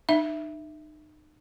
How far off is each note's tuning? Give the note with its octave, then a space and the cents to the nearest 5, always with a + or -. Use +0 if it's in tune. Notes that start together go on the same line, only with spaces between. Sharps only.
D#4 -30 E5 +0